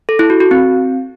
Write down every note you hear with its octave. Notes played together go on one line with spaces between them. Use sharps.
A4
E4
F#4
F#4
C4